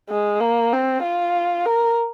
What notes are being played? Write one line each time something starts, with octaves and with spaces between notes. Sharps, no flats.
G#3
A#3
C4
F4
A#4